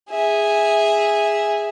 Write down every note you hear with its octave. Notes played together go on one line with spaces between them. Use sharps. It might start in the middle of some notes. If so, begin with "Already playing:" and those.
G#4 E5